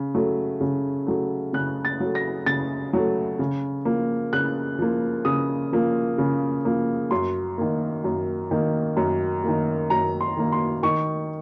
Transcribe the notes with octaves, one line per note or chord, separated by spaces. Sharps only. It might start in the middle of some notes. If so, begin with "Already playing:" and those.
Already playing: C#3
F#3 A3
C#3
F#3 A3
C#3 F#6
A6
F#3 A3
A#6
C#3 A6
F#3 A3
C#3
F3 A#3
C#3 F#6
F3 A#3
C#3 D#6
F3 A#3
C#3
F3 A#3
F#2 C6
D#3 A#3
F#2
D#3 A#3
F#2
D#3 A#3
F#2 A#5
C6
D#3 A#3
C6
D#3 C#6